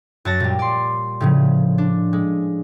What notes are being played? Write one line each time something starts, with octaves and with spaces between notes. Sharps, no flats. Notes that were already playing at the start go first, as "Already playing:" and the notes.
F#2 F#4 A5 A6 A#6
A#2 G3
D5 C6
A2 C#3 F3
D4
G#3